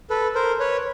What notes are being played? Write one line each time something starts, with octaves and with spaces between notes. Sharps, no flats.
A4 B4
A#4 C5
B4 C#5